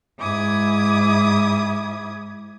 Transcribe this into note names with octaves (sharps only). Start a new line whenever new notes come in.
G#2 E4 D6 D#6 G#6